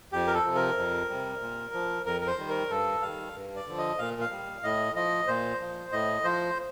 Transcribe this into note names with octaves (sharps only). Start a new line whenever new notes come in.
F2 G4
A#4
A4
C3 F3
A#4
F2
C3 G3
A#2
F3
F2 A#4
A#4
C5
D#3 G3
A#4
G2 A4
D#3 G3 F5
G2
D5
D3 F3
D#5
A#2 F5
F5
G3
A2 D#5
F3 D#5
A#2 C5
F3
A2 D#5
F3 C5